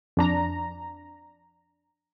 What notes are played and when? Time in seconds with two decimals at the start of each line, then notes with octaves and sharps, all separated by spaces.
0.17 F2 D4 A#5